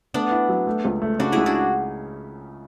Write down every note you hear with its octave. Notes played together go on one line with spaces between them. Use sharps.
A3 B3 D4
E4
F#3
A3
C#2
A3
C#3 D4 F#4
C#2 E4 G#4
D4 F#4